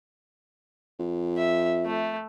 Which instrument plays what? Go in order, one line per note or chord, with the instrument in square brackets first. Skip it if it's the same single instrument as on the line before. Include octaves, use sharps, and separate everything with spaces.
[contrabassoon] F2
[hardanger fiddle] E5
A3